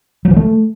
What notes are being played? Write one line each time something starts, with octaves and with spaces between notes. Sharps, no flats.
F#3
E3
A3